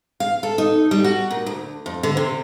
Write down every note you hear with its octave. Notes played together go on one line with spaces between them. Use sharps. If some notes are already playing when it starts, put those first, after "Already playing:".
F5
A4
D#4
G3
F#4
A#2
D2
F2
D3
C3